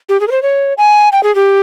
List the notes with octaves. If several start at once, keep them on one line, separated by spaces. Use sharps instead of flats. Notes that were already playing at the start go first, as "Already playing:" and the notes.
G4
G#4
A#4
C5
C#5
G#5
G5
G#4
G4